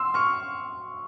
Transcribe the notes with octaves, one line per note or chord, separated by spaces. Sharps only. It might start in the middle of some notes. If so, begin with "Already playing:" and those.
Already playing: C6 E6
C#6 F6